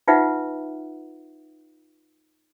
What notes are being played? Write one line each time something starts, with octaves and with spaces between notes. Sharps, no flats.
D#4 F4 B4 E5 F#5